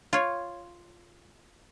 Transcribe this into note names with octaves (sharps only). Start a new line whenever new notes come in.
F4 C#5